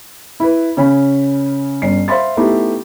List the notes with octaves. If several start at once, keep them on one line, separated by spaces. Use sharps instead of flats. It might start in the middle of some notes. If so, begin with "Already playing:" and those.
E4 B4
C#3 C#4 B5
G1 C#4 C7
C5 E5 F5 B5 C6 A6
A3 B3 D#4 E4 G4